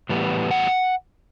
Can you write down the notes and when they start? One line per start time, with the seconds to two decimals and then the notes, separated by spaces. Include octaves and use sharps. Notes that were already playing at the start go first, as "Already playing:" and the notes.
0.09 A2 E3 G3 B3
0.51 F#5